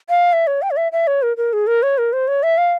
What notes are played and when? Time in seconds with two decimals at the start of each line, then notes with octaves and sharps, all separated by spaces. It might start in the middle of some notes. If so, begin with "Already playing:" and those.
0.09 F5
0.33 E5
0.47 C#5
0.62 G5
0.71 C#5
0.77 E5
0.92 E5
1.07 C#5
1.22 A#4
1.37 A#4
1.53 G#4
1.67 A#4
1.83 C#5
1.98 A#4
2.13 C5
2.28 C#5
2.43 E5
2.58 F5